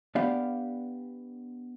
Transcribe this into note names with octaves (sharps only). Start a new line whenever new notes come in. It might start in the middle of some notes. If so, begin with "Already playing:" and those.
B3 D4 G4 D5 F5